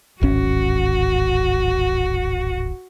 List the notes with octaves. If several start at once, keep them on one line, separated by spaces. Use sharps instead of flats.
D1 G#1 C#4 F#4